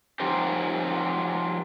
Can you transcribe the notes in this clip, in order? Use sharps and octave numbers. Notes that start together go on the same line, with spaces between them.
F3 F#3 D#4 F4 G4 C5